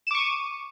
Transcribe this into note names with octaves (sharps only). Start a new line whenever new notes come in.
C#6 D6 D#7 E7